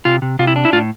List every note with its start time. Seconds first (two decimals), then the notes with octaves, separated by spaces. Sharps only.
0.05 C3 F4
0.22 C3
0.39 C3 F4
0.47 E4
0.56 D4
0.65 E4
0.73 A2 F4